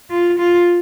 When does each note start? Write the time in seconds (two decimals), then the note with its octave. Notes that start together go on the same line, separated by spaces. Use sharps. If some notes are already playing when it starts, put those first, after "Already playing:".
0.10 F4
0.39 F4